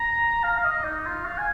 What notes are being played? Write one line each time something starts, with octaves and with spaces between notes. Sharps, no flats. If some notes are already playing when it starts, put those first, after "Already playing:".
Already playing: A#5
F5
F5
D#5
D#4
F4
F5
G#5